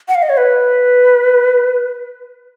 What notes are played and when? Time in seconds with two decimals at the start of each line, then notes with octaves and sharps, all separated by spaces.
0.08 F#5
0.15 F5
0.22 D#5
0.29 C#5
0.37 B4